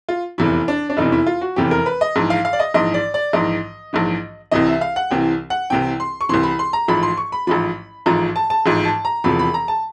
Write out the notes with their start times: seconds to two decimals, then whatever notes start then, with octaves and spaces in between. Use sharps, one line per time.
0.09 F4
0.38 F1 E2 C3 E3 E4
0.68 D4
0.90 D4
0.97 F1 E2 C3 E3 D#4
1.12 E4
1.26 F4
1.41 F#4
1.56 F1 E2 C3 E3 G4
1.71 A#4
1.86 B4
2.01 D#5
2.16 A#1 G#2 E3
2.30 F5
2.45 F5
2.53 D5
2.60 D#5
2.74 A#1 G#2 E3 D#5
2.94 D5
3.14 D5
3.33 A#1 G#2 E3 D#5
3.93 A#1 G#2 E3
4.51 C2 C3 E3 D#5
4.67 E5
4.81 F5
4.96 F#5
5.11 C2 C3 E3 G5
5.50 F#5
5.70 C2 C3 E3 G5
6.00 C6
6.21 C#6
6.29 C2 C3 E3 C6
6.43 B5
6.59 C6
6.73 A#5
6.88 A1 G#2 F3 B5
7.03 C6
7.17 C#6
7.32 B5
7.47 A1 G#2 F3 B5
8.06 A1 G#2 F3 A#5
8.36 A5
8.50 A5
8.66 A1 G#2 F3
8.85 A5
9.05 A#5
9.24 E1 E2 C3 F3 B5
9.39 B5
9.54 A#5
9.68 A5